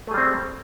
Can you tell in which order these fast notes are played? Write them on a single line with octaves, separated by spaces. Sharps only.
A3 G#4 G3 C4